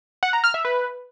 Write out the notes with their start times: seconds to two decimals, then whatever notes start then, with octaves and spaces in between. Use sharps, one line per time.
0.23 F#5
0.33 A#5
0.44 F6
0.54 E5
0.65 B4